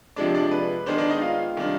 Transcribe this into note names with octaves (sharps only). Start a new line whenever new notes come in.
C3 F3 G#3 D4 D5
D4 D5
B4
D#3 G#3 B3 D4 C5
D4 D5
D#4 D#5
F4 F5
C3 D#3 G3 D4